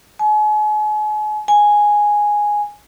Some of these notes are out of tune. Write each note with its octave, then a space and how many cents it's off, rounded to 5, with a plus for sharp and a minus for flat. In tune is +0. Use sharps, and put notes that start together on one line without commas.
G#5 +40
G#5 +0